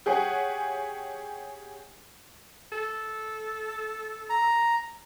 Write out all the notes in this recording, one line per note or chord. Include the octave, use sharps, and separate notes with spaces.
G4 G#4 C#5 F#5 G#5
A4
A#5